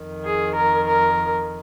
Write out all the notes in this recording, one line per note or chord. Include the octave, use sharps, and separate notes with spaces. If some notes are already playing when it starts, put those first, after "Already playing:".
Already playing: F2 D#3
G#4
A#4
A#4